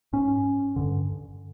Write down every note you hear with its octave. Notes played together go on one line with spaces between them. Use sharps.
G#2 C#4
G2 D3